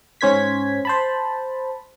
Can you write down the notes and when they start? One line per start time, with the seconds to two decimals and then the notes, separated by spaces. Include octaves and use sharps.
0.21 G#2 C#4 C5 G#6 B6
0.85 C5 A5 B5